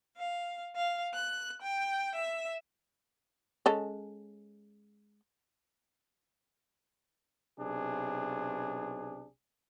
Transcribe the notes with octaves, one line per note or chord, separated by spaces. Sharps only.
F5
F5
F#6
G5
E5
G#3 C#4 A4
B1 C3 D4 G#4